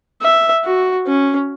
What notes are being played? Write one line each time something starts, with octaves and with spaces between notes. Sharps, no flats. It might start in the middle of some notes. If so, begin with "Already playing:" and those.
E5
F#4
C#4